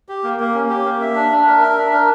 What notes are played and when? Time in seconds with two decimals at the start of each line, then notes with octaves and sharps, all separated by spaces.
0.09 G4
0.24 A#3
0.40 A#3
0.54 C#4
0.69 G4
0.85 A#3
1.01 E5
1.16 D4
1.32 D4
1.47 A#4
1.62 E5
1.78 D4
1.92 A#4